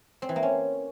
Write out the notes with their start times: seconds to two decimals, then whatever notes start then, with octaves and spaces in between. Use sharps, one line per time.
0.22 C4
0.29 E3
0.36 A#3
0.43 C#4